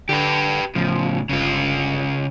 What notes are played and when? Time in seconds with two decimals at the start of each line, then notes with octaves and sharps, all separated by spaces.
0.09 D3 G4 B4
0.75 A2 C#3 F3
1.29 G1 C#3 F4